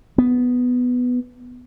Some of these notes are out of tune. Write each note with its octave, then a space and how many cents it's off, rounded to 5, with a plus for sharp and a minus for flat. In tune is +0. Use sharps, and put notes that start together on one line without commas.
B3 +5